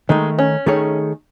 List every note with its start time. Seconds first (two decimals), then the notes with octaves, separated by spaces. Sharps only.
0.09 D#3 G#3 A3 D#4
0.39 C#4
0.66 D#3 A3 D#4 G#4 C#5